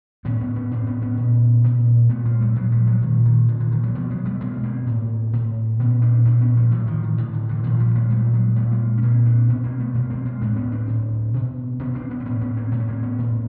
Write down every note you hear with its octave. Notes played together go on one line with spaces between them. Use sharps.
A2 B3 C#4
B3 C#4
B3 C#4
A2 C4 D4
B3 C#4
B3 C#4
A#2
A#2
A#2 A3 B3
G#3 A#3
G3 A3
A#2 F#3 G#3
F3 G3
F#3 G#3
A#2 D#3
D#3
A#2 D3
D3
D#3
E3 F#3
B2 F3 G3
F#3 G#3
G3 A3
B2 G#3 A#3
A#3 C4
A2
A2
A#2 B3 C#4
C4 D4
A#2 C4 D4
B3 C#4
F3 G3
A2 E3 F#3
D#3 F3
D#3
A2 D3
D3
D3 E3
A#2 D#3 F3
F3 G3
G#3 A#3
A#2 G3 A3
F#3 G#3
A#2 G3 A3
G#3 A#3
C#4
A#2 A#3 C4
C4 D4
B2 B3 C#4
A#3 C4
A3 B3
B2 G#3 A#3
A#3 C4
G#3 A#3
A2 C4 D4
B3 C#4
C4 D4
A2
B2
B2 B3 C#4
C4 D4
B3 C#4
C4
A2 B3 C#4
B3 C#4
A#3 C4
A2 A3 B3
C#4
A#3 C4
B3 C#4
A2